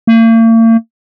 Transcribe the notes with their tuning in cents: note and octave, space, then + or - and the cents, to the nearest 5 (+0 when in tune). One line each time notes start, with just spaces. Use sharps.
A#3 -45